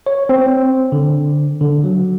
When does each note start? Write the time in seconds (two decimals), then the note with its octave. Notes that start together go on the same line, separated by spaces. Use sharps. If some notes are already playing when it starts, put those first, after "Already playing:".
0.06 C#5
0.29 C4
0.92 D3
1.61 D3
1.84 F#3